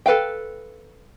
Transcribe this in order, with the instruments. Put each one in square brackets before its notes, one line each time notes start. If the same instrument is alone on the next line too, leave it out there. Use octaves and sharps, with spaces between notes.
[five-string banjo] A4 B4 F5 G5